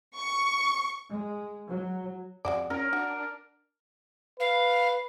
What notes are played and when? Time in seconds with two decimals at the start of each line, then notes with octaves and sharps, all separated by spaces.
0.18 C#6
1.10 G#3
1.68 F#3
2.45 F2 G#3 F#4 D5
2.70 C#4 A#4
2.93 D4 F#4
4.40 B4 F5